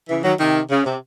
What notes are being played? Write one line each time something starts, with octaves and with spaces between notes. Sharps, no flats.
C#3 E3
D#3 F#3
C3 D#3
C#3
C3